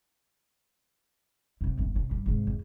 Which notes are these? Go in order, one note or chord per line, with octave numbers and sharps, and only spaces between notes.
F#2 C3
G1 D#2
C3
G2
G#2 C3
E2